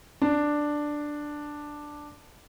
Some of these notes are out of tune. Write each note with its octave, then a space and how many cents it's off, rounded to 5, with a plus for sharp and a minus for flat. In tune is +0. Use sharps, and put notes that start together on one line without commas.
D4 +5